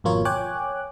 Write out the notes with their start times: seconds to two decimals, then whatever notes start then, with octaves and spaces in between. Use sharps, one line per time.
0.04 G#1 F2 B2 A#3 F4 C#5
0.25 C#5 G5 G#5 D6 F#6